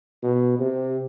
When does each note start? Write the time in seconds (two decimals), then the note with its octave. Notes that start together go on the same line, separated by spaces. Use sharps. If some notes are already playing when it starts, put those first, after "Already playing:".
0.23 B2
0.59 C3